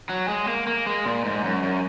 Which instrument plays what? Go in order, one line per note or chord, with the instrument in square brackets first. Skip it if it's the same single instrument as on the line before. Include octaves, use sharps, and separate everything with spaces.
[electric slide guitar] F#3
G#3
A#3
A#3
G#3
A#2
G#2
F#2
F#2